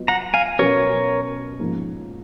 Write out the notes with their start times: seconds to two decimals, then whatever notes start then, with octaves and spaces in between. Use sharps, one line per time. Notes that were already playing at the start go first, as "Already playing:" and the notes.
Already playing: F#3 B3 F4 D#5
0.08 F#5 A#5
0.34 F5 G#5
0.59 B2 F#3 C#4 F#4 A#4 B4 C#5
1.60 G#2 F3 A#3